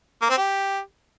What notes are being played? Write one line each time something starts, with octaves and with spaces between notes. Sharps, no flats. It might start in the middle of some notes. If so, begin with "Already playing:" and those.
A#3
C4
G4